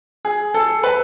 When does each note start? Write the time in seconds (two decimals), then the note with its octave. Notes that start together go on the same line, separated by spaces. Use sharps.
0.25 G#4
0.54 A4
0.83 B4